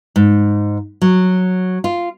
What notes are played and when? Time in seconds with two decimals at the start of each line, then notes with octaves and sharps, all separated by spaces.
0.16 G#2
1.02 F#3
1.84 F4